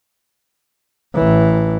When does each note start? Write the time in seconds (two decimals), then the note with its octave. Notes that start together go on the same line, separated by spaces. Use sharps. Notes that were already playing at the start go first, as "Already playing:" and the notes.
1.15 A1 E3